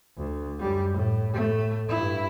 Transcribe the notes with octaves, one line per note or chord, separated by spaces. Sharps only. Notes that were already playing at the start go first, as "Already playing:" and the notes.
D2
F#2 G3
A2
A2 A3
G2 E4